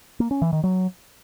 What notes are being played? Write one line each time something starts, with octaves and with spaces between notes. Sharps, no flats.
A#3
C#4
E3
D#3
F#3